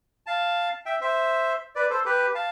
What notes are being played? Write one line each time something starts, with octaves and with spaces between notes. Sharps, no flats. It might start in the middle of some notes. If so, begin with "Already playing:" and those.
F5 A5
E5 G5
C5 E5
B4 D5
A4 C5
G4 B4
F5 A5